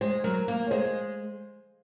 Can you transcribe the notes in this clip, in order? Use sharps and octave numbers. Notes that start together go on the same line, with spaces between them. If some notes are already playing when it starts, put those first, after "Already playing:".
G#3 C5
F#3 A#4
A#3 A#4
C#5
G#3 C5